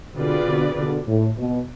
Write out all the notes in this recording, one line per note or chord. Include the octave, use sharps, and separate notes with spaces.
B2 D3 C4 F4 G#4 B4 D5
B2 D3
B2 D3
A2
B2